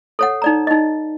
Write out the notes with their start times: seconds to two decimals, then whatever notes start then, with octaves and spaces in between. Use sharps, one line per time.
0.19 A4 C#5 F#5
0.42 D#4 D5 A#5
0.67 D#4 D#5